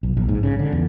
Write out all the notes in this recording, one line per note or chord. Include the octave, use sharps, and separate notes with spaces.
B1
A#1
G#2
C#3
D3
E2